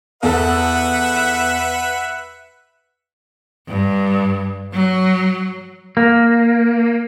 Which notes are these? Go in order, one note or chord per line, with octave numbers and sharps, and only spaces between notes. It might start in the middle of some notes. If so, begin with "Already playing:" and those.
E2 A4 B4 E5 F#5
G2
F#3
A#3